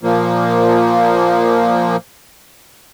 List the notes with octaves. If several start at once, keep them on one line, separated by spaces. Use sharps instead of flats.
A#2 F3 A#3